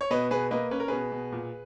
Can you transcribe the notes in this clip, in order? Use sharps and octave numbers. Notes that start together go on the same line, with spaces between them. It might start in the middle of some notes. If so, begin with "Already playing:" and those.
C#5
B2 B4 D#5
B2 G#4 B4
A#3 B4 D#5
C#4 B4
A#4
B2 G#4 B4
B2
A#2